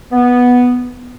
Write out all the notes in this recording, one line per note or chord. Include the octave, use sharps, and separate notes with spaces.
B3